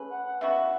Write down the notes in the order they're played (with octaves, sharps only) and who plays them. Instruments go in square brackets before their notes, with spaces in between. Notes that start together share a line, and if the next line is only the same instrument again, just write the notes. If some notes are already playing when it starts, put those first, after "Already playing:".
Already playing: [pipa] A3 C#4 G#4 B4
[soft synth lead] F#5
F#5
[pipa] C#3 E3 B3 F#4 [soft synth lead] E5